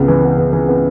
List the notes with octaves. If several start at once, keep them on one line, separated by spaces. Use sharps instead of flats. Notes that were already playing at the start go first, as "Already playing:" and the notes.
Already playing: C#2 B3
E3
B3
E3
E3
B3